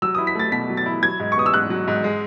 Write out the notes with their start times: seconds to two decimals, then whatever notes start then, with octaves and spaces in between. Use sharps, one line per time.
0.02 F#3 E6
0.15 E4 D#6
0.27 B6
0.35 A3 A6
0.52 B2 B6
0.70 F#3
0.77 A6
0.86 E4
1.02 F#3 G#6
1.20 G#2
1.32 C#6
1.36 B3 D#6
1.46 E6
1.53 G#2 F#6
1.70 F#3
1.88 G#2
2.04 G#3